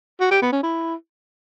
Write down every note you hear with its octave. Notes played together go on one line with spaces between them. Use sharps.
F#4
G4
B3
C#4
E4